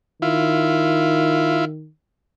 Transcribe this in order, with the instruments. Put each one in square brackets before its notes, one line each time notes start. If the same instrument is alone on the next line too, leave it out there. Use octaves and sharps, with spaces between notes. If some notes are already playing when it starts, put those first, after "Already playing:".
[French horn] D#3 [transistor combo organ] E4 F4